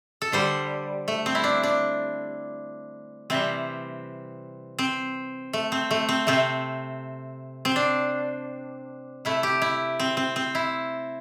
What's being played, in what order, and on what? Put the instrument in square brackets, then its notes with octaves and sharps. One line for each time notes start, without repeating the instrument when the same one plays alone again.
[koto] A4
D3 G3 C5
A3
C4
E4
D4
D4
C3 E3 G3 C4
C4
A3
C4
A3
C4
C3 A3 C4
C4
D4
C3 A3 E4
G4
E4
C4
C4
C4
E4